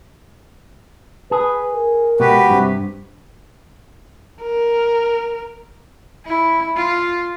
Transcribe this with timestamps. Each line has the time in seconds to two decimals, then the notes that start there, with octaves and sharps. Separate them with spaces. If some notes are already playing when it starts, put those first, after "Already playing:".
1.31 G#4 B4
1.74 A#4
2.20 B2 G#3 F#4 G4 B4
2.50 G2 C3
4.43 A#4
6.25 E4
6.77 F4